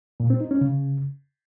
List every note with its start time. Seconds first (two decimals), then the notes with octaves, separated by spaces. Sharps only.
0.20 A#2
0.30 C4
0.41 D#4
0.51 C#4
0.61 C#3